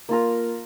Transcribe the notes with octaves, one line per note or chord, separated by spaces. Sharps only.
A#3 F4 A#4